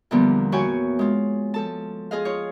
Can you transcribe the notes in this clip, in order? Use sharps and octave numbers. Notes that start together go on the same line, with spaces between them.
E2 A#2 D3 F3 G3 B3
E4 F#4 C#5 G5 G#5
G#3 F4
F3 A4 A5
F4 G#4 D#5 F5
F4 C#5